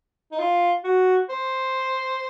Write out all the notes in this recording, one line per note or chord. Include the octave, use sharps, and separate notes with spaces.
D#4
F4
F#4
C5